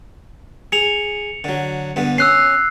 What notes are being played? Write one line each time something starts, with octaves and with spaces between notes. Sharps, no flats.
G#4 C#7 F7
D3 F#3
G2 D3 B3
C#4 E6 F#6 C7